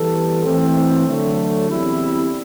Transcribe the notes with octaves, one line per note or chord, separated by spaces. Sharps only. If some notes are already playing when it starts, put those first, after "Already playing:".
Already playing: E3 G3 B3 E4 A4
E3 A3 C4
D3 F#3 A3
E2 C3 G3 C4 E4